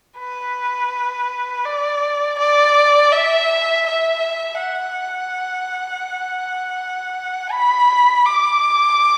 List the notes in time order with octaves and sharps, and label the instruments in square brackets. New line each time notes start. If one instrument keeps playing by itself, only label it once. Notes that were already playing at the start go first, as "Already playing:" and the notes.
[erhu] B4
D5
D5
E5
E5
F#5
B5
D6